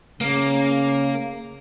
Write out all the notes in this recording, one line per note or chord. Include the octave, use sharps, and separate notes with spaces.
C#3 A#3